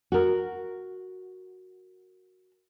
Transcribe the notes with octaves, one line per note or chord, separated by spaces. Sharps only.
F#4 A#4